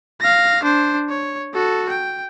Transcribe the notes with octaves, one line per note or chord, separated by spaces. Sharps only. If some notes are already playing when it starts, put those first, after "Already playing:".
F5 A#6
D4 C5
C#5
F#4 A4
G5